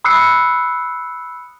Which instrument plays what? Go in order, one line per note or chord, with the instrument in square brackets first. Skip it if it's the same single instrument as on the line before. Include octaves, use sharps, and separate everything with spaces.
[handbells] B5 D#6 E6 F#6 C7 C#7